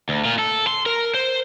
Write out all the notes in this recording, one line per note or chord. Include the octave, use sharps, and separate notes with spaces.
D2
A#2 F4
A4
C6
A#4
C5